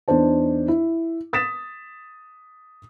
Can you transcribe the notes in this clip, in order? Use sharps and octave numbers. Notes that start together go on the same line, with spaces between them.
E2 D4 D#4 C5 A5
E4
D#6 A6 B6 E7